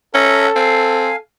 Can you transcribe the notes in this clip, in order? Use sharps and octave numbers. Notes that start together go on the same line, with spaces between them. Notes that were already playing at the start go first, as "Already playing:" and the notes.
C#4 A4 E5 F#5 A#5
C4 F5 G#5